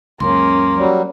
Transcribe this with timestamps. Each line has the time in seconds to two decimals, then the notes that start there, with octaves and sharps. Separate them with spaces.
0.20 C#2 F#2 C#3 A#3 C#4 C6
0.77 F#3 G3